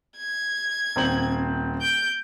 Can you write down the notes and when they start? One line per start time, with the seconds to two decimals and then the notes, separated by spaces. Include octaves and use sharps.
0.17 G#6
0.96 D#1 C4 F#7
1.81 G6 D7